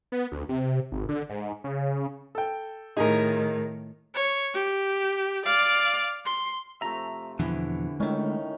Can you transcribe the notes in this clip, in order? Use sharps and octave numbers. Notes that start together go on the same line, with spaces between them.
B3
D2
C3
G#1
D3
G#2
C#3
A4 G5
A2 D#3 D#4 G#4 A#4
C#5
G4
D5 F5
C6
C3 F3 A3 E5 A#5
E2 B2 D3 E3 F3 E4
A2 D#3 G#3 A3 C#4